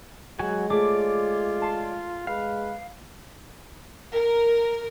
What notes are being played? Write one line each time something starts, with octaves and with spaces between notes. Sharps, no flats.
F#3 G#3 F#4 G#5
A3 F4 G#4 C#5 D5 D6
A5 C6
G#3 B4 F5
A#4